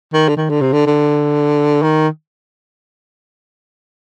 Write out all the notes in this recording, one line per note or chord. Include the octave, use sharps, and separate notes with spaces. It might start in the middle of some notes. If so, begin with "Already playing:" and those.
D#3
D3
D#3
D3
C3
D3
D3
D#3